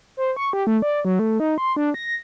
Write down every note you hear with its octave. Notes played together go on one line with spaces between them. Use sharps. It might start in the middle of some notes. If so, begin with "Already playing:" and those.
C5
C#6
G4
A3
D5
F#3
A3
D#4
C6
D4
A#6